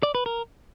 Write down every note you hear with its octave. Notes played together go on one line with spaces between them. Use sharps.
D5
B4
A#4